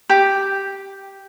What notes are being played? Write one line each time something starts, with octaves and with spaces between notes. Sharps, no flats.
G4